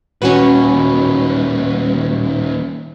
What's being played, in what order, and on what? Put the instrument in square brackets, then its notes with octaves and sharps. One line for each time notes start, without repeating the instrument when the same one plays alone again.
[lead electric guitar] D#2 A#2 [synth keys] C#4 F#4 B4